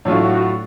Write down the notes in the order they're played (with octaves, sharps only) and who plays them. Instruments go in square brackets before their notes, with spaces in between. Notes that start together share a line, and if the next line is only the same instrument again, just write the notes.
[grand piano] A2 F#3 A3 D4 F4 [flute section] F#4